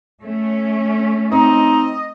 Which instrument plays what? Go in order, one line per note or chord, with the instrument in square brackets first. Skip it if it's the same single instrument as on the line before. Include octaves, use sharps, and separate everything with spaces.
[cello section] A3 C#4
[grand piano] C4 [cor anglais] D#4 [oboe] D#5